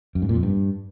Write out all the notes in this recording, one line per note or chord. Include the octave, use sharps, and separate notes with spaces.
F#2
G#2
A#2
F2
G2